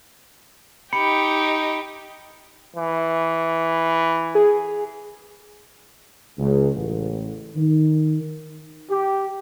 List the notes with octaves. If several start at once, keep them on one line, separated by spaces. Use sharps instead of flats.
D#4 G4 B5 C#7
E3
G#4
C#2
A1
D#3
G4